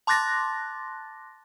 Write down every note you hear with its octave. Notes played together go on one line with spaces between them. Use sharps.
A5 C6 D6 F#6 A6 A#6